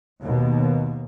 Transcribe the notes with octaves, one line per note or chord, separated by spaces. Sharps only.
D#2 B2